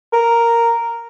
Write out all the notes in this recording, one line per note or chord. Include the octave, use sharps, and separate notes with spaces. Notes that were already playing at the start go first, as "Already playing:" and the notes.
A#4